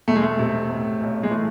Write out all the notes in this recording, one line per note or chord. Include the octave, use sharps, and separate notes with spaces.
E1 A3
G#3
A3
C3
A2
B1
G#3
E3 A3